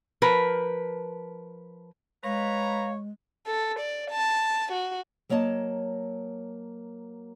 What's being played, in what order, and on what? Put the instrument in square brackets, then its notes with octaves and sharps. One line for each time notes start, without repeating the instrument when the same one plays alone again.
[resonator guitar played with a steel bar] F3 A#4 B4
[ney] G#3 [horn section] B4 A#5 [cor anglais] C#5 [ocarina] F5
[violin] A4
D5
A5
F#4
[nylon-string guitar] F#3 A#3 C#5 D#5 A5